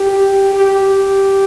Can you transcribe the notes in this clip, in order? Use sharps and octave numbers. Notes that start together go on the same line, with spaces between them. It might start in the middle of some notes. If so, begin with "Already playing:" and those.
Already playing: G4
G4